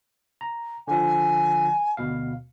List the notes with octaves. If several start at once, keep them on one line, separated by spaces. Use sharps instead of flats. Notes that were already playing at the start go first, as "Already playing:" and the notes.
A#5
D3 F3 G#5
D2 B2 F5